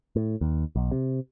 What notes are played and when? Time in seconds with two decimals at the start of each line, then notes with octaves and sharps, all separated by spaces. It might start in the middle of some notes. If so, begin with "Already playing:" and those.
0.16 A2
0.41 D#2
0.76 B1
0.91 C3